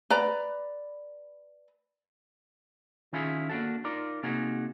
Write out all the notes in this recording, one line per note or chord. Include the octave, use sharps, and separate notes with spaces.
B4 D5 A#5
D#3 C#4 E4 F4 G#4
A#3 D4 F4 F#4 A4
D#4 F4 A#4 D5
C3 A#3 D#4 F#4 G#4